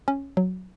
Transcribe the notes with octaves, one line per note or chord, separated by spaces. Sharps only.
C#4
F#3